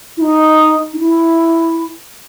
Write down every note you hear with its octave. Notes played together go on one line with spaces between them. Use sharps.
E4
D#4
D#4
E4